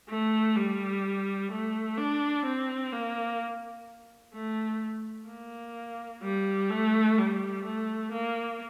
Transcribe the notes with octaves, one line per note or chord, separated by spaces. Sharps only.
A3
G3
A3
D4
C4
A#3
A3
A#3
G3
A3
G3
A3
A#3